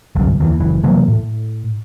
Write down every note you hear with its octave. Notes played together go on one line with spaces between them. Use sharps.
G1 C2 F#2
D#2 D#3 E3
F#1 E3
C3 E3 F#3 A#3
A2